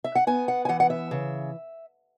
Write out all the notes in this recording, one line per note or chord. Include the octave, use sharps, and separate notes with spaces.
E5
F#5
B3 G#5
F#5
G#5
E3 F#5
F#5
E5
C#3